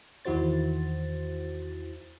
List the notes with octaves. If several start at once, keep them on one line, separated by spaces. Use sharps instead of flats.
E2 D#3 E4 F#4 C5 A6